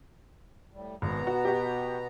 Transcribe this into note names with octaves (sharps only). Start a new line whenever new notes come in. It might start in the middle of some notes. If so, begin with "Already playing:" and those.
A2 G3
G#1 B2 B3 A#5
F#4
F#4 G4